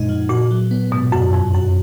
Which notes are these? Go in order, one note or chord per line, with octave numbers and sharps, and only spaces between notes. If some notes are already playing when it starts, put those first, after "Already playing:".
Already playing: F#2 A#2 G#3 D#4
F3
A#2 F#4
F#3
B3
G#2 B2
F#2 F#4
F2 F#3
F#2 F#4